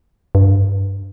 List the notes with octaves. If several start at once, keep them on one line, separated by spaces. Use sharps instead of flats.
G2